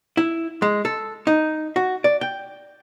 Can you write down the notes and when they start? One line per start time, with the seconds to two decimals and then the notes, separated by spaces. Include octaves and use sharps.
0.17 E4
0.62 G#3
0.85 A4
1.27 D#4
1.76 F#4
2.04 D5
2.21 G5